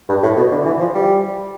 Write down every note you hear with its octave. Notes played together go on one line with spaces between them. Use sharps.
G2
A2
B2
D3
E3
F3
G3